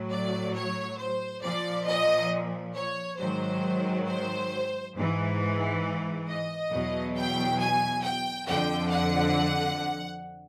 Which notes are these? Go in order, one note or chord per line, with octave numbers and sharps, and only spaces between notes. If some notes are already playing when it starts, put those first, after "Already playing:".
Already playing: A2 F#3
D5
C#5
C5
A#2 F3 D5
D#5
C#5
G#2 D#3 F#3 C5
C5
G#2 E3
D#5
E2 B2 F#3
G5
G#5
G5
F2 D3 F3 G5
F#5